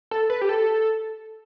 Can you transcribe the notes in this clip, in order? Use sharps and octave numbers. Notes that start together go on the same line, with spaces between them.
A4
B4
G4
A4